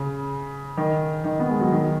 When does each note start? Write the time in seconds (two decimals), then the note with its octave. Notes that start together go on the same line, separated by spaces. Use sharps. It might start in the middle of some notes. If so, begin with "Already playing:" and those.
Already playing: C#3
0.77 D#3
1.24 D#3
1.40 B3
1.50 G#3
1.61 F#3
1.72 D#3